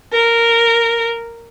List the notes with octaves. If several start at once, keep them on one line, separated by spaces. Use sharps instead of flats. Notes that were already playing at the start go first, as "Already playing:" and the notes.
A#4